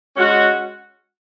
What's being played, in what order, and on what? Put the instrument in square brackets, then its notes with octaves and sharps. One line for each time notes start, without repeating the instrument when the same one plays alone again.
[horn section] G#3 C#4 F#4